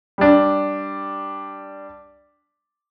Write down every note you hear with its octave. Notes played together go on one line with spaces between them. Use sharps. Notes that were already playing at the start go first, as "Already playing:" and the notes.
G3 D4